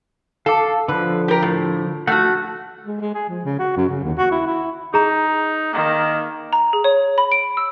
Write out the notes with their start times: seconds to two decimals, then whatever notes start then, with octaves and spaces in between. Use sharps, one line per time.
0.46 A4 F5 A5 D6
0.88 D3 F3 B4
1.28 G4 A#4
1.42 A2
2.07 A3 F#4 F#5 F6
2.87 G#3
3.01 G#3
3.15 G#4
3.29 F3
3.45 C#3
3.59 F#4
3.77 F#2
3.89 C#3
4.04 D#2
4.18 F#4
4.32 E4
4.47 E4
4.94 D#4 G#4 A#5
5.73 D#3 A#3
6.53 A#5
6.73 G#4
6.84 C#5
7.18 B5
7.32 D7
7.57 E6